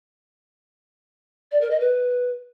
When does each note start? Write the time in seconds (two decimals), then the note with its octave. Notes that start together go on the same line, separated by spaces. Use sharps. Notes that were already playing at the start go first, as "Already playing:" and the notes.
1.52 D5
1.61 A#4
1.71 D#5
1.80 B4